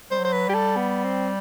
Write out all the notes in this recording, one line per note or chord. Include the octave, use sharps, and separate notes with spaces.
G3 C5
F#3
C5
B4
G3 G4
A4
B3
C4